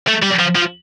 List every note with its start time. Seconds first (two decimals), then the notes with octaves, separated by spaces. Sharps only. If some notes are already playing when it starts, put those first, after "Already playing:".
0.08 A3
0.23 G3
0.39 F3
0.55 F3